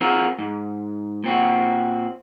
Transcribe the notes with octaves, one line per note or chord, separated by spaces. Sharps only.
C4 F4 F#4 G#4 A#4
G#2
A#2 C4 F#4